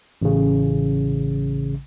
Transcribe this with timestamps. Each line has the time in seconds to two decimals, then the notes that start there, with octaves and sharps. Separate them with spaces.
0.22 A1 C#3